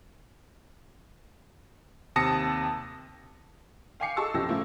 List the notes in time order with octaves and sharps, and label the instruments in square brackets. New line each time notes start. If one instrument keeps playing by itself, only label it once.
[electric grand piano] D#2 C3 A5 D#6 A#6 C#7
[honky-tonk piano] F5 G5 G#5 D6 C7 C#7
G#4 A4 D#5 A5 C#6 E6
C2 F#2 F3 G4 E6 A#6
A2 C#3 F3 A3 A#3